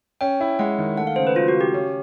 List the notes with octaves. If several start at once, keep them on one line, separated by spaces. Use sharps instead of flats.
C#4 G5
E4
G#3 F#5
D#3
A3 F#5
F5
C#3 C5
B4
F#3 F4
F#4
C#3
G4
C#4